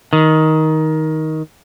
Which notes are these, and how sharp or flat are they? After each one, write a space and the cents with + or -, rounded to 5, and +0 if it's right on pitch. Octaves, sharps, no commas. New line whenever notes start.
D#3 +15